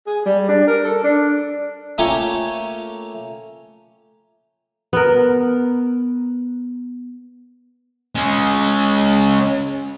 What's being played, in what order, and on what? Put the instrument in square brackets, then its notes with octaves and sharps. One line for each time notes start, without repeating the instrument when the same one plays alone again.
[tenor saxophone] G#4
G3
D4
A#4
A4
D4
[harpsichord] A3 A#3 C#4 F4 G4 C#5
[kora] B3 A#4
[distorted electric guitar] G#3 C#4